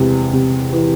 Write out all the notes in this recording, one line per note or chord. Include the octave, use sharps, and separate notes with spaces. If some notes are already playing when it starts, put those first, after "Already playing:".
Already playing: E2 C3 G#3
C3
E3